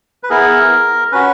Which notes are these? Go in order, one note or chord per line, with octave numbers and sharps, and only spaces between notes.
B4
B3 E4 G#4 A#4
C#4 F#4 B4